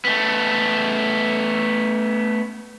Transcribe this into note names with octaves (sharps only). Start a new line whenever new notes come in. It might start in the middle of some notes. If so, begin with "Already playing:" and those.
A3 B3